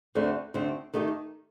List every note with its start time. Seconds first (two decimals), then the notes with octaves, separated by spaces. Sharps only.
0.15 D2 D3 A3 C4
0.54 D2 D3 A3 C4
0.94 D#3 A3 D#4 G4